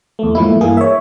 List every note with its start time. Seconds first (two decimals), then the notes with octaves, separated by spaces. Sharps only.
0.19 E2 A3
0.35 G#2 E3 F3 A3 A#3 E4
0.61 G2 E3 A#3 G#4
0.77 C#5 E5